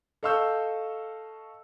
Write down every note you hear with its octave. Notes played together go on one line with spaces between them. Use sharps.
A4 D#5 F5 C#6 E6 G6